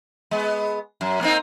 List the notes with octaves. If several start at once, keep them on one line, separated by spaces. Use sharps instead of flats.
G#3 B3
F#2
A#3 C4 D#4